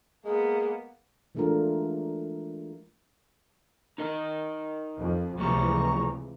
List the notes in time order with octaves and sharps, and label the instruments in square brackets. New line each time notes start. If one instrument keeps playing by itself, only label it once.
[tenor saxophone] G#3 [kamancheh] A#3 B3
[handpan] E3 G#3 A3 D4 F4 A#4
[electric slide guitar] D#4 A#4 D#5
[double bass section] F2
[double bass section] C#2 C3 E3 [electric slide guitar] F3 G3 A3 [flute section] A#5 C#6